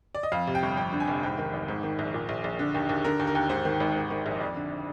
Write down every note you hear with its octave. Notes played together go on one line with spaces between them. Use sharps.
D5
D#5
F2 F5
C3
G5
G1
F2 G5
D3
G#5
F1
G#2 G5
D#3
G#1
G#2
D#3
A#1
A#2
A#1
A#1
D3
D#2
D#2
D3 A#4
D#2
A#4
D#2
G#2 C5
D#3
G#1
G#2
D#3
A#1
D#5
F2 D5
D3